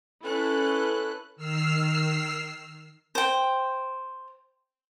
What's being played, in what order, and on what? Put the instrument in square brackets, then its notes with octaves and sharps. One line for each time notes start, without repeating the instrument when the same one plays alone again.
[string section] C#4 E4 A4 B4 F#6
[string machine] D#3 E6 F6 C7
[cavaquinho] C5 G5